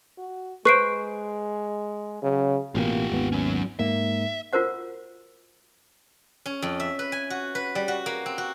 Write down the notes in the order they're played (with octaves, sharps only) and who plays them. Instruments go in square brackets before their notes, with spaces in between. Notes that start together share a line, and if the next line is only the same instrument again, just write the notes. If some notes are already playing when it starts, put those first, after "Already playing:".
[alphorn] F#4
[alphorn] G#3 [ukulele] B4 C5 [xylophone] C#6 C7 D7
[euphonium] C#3 [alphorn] F#3
[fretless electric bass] A1 B2 A#3 [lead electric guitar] F4 G4
[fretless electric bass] G#1 D#2 B3
[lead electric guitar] F#3 C#4
[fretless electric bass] G#2 A#3 [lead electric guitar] E5
[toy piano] F4 F#4 A#4 C5 F#5
[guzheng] C#4
F2
E5
B4
G#5
F#4
B4
G3
F#4
A#3
C4
F#4